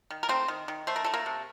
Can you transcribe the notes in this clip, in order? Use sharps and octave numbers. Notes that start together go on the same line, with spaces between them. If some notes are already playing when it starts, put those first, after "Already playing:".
D#3
A#4
A3 C4 C5
D#3
D#3
A3 C5
A#4
A3 A4
A#3 A#4
C3